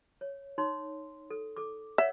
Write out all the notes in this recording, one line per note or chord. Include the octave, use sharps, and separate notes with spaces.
C#5
D#4 C#5 C6
A4
A4 D6
C#5 D5 E5 F#5